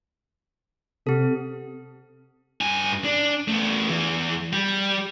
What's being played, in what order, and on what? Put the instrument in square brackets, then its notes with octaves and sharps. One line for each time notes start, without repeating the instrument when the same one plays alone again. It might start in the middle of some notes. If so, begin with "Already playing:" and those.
[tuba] C3 [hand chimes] C4 A4
[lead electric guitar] G2 G#5
D4
A3 B3
E2 E3
G3